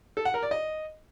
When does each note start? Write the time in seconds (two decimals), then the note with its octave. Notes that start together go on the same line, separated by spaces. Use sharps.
0.17 A4
0.25 F#5
0.34 A#4
0.43 D5
0.51 D#5